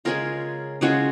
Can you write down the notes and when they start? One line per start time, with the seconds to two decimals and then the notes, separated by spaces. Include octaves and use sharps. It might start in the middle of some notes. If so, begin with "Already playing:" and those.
0.05 C#3 G#3 C#4 F4 A#4
0.81 C#3 G#3 C#4 F4 F#4